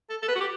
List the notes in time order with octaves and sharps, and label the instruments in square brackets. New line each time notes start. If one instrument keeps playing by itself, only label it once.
[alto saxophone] A4
A4
B4
F#4
G4